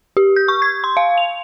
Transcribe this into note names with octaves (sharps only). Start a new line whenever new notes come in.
G4
G6
C#6
G#6
C6
F5
F7